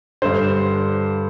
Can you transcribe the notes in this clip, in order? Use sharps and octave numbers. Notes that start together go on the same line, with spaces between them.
G2 D3 C5